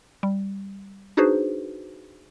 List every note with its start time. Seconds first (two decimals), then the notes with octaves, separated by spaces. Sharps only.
0.23 G3
1.17 D4 D#4 F#4 G#4 B4 C5